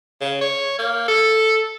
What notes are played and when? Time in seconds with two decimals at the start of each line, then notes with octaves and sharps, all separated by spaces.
0.21 C#3
0.41 C#5
0.79 A#3
1.08 A4